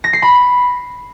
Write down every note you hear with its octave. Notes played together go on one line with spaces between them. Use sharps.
A#6
C7
B5